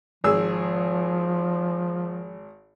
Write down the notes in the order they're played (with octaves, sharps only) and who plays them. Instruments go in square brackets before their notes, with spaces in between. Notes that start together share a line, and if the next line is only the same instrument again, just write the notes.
[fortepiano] G#1 G#4 E6 [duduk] F3